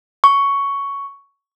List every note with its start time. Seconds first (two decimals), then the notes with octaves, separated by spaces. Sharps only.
0.24 C#6